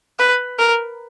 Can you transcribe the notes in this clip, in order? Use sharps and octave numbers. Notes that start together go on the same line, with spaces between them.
B4
A#4